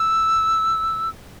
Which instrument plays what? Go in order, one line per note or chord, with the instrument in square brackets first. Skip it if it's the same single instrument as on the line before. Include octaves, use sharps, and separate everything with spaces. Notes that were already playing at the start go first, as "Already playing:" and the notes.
Already playing: [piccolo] E6